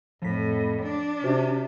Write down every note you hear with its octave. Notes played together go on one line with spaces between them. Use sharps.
F2 A2 F3 B6
D4
C3 C#4 F#4 C5